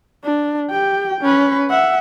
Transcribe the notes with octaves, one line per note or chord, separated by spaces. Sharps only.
D4
G4 G5
C#4 B4
E5 F#5